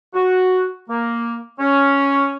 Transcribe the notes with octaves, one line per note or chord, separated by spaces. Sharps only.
F#4
A#3
C#4